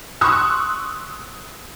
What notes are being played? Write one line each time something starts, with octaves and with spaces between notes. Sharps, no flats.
C6 C#6 D#6 E6 F#6